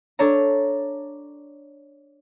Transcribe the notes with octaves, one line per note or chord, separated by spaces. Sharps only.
D4 A4 C#5 A#5